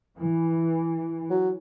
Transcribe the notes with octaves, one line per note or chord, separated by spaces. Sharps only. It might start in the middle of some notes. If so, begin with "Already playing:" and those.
E3
F#3